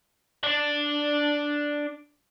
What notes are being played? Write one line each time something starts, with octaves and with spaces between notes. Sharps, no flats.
D4 D5